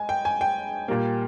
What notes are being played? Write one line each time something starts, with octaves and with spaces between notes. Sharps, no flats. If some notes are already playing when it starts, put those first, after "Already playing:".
Already playing: G#3 G#5
G5
G#5
G5
A#2 G3 A#3